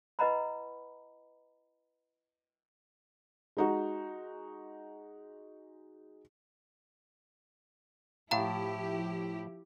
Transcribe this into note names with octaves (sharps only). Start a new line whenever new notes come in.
E4 B4 D#5 F#5 A#5 B5
G#3 D#4 F#4
A2 F3 E4 G4 F5 A5 A#5